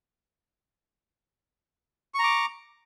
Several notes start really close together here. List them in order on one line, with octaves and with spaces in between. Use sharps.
C#6 A#5 D6